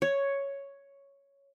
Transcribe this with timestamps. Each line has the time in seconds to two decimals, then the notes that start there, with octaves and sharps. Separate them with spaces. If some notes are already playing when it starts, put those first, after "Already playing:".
0.02 C#5